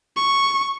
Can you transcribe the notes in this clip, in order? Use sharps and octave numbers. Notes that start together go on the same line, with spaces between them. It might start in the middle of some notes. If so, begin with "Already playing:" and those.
C#6